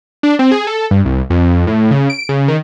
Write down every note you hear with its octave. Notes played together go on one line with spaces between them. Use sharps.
D4
C4
G#4
A4
G2
C2
F2
A2
C#3
D7
C#3
D#3